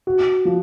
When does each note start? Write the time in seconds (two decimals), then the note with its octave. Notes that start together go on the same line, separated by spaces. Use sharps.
0.07 F#4
0.45 F3